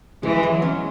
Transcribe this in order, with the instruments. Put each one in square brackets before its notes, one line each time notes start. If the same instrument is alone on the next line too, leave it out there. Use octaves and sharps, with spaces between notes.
[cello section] E3 [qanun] G#3
[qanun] G#3
[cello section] F#3
[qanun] C#4